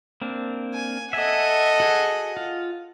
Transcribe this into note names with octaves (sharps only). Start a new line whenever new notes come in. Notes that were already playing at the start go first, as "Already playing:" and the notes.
A#3 C4 D4
G#5
A4 D#5 E5 F#5 G#5
F#4 G#4
F4